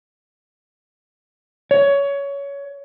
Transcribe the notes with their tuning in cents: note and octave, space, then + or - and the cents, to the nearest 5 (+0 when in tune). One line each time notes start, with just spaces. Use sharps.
C#5 +20